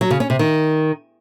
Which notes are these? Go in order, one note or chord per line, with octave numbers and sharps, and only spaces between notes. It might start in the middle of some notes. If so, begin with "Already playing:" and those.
F#3
C#3
C#4
C3
D#3